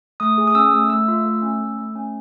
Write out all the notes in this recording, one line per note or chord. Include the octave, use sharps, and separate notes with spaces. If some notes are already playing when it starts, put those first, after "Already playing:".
A3 D#6
G#4
D#6
C#4 E6
A3
A3 E6
F4
A3
C#4
A3
A3
C#4